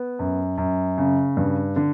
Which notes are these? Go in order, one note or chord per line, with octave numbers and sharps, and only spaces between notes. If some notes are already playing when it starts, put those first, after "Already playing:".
Already playing: B3
F#2
F#2
C#3
G2
D3